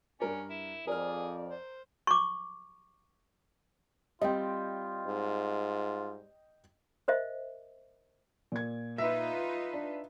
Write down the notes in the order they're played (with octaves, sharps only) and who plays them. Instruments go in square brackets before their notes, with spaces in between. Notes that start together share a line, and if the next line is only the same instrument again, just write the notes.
[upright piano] G2 A#4 D5 [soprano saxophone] C#4
[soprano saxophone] E4
[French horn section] F2 D5 [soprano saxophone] G#4 [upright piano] A#4 F6
[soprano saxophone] C5
[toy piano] C#6 D6
[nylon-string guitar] G3 C4 [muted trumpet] F4 [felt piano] D#5 G5
[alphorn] G#2
[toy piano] A#4 C5 D#5 E5
[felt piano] A#2 G#6
[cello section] D#4 F4 B4 [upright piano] E5
[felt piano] D4